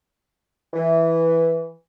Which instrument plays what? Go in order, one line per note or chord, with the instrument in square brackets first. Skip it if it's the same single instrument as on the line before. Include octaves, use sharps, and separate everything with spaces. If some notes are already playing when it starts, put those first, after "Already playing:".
[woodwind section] E3